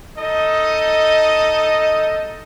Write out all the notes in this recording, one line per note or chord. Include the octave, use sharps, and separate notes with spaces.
D#4 A4 D#5